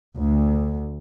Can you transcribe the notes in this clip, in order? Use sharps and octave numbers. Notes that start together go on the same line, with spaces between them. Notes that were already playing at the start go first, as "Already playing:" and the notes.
D2